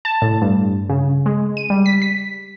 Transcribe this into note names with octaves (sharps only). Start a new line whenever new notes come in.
A5
A2
G2
C#3
G#3
D#7
G3
B6
B6